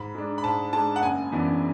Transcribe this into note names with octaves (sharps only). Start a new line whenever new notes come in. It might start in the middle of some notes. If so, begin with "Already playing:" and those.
Already playing: G#2 B5
G#3 D4
B5
G#2 A5
G#3 D4 A5
F#5
F#1 G#5
F#2 E3 B3 D4